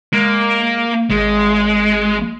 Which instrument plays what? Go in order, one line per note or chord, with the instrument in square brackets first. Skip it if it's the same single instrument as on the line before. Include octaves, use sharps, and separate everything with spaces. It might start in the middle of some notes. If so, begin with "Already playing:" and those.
[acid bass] G#3 [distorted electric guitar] A#3
[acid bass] G#1 [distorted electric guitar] G#3